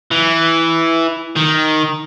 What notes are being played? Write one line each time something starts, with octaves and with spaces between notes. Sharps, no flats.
E3
D#3